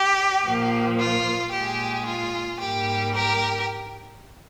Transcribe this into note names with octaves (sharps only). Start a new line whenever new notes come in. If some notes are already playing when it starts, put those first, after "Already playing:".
Already playing: G4
A#2 F3 A#3
F4
A#2 G#3 G4
F4
G#2 G3 A#3 G4
G4 A#4